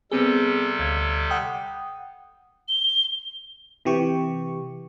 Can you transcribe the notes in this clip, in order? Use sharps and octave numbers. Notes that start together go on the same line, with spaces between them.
C3 G3 B3 C4 G#4 A4
D2 G#6
F#5 G5 D#6
G7
C3 E3 G4 C#6